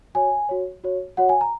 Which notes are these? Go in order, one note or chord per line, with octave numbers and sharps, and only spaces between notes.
F#4 C#5 G#5
F#4 C#5
F#4 C#5
F#4 C#5 F#5
G#5
A#5